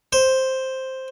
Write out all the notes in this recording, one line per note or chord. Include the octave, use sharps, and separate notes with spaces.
C5